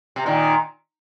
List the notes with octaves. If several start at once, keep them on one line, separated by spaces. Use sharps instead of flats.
C3
A#2 D#3